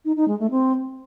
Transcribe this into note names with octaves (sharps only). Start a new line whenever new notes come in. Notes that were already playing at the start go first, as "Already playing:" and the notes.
D#4
D#4
G#3
A3
C4